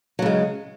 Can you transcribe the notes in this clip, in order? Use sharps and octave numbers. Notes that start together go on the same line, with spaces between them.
C#3 F#3 G#3